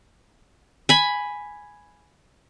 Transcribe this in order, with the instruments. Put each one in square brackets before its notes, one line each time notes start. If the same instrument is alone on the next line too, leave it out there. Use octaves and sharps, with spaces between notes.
[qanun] G#5 B5